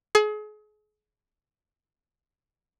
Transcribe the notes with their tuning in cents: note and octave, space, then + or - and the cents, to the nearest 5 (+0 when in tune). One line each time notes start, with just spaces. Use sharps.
G#4 +35